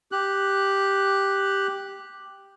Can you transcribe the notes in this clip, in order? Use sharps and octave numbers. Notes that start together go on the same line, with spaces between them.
G4 F#6